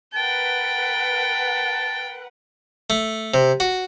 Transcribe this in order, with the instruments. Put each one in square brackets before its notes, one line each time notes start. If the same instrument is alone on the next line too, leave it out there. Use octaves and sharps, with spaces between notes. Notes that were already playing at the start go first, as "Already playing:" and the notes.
[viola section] A#4 B4 F#5 [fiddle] G5 [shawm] A5
[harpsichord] A3
C3
F#4